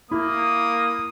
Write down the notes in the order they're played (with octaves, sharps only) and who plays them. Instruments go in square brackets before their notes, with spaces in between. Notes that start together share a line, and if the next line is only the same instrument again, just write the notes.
[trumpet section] A#3 [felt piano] E4 [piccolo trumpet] D#6